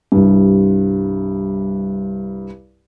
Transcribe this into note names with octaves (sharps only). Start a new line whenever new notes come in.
C2 G2